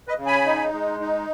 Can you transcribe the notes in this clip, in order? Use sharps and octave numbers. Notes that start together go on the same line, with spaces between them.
B4 D#5
C#3
G#5 B5
D#4
G#3
D#4